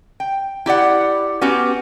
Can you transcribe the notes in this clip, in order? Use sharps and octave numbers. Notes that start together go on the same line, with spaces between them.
G5
E4 G4 D5 F#5
B3 C#4 F#4 G4